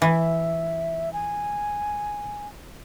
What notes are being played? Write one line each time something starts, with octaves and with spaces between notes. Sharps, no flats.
E3 E5
G#5